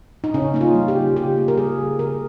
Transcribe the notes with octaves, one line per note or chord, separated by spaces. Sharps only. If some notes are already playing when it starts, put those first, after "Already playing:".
D#4
C#3 C#4
A#3 D#4
F4
G3
G4
C#3
C#3 G4
A#3
A#4
G3 G#4
C#3
C#3 A#4